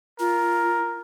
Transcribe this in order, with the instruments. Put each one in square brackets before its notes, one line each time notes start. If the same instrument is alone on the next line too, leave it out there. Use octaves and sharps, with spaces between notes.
[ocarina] F4 [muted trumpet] A#4